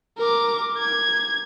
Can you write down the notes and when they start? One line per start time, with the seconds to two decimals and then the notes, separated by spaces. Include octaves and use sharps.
0.18 A#4 D6
0.79 G#6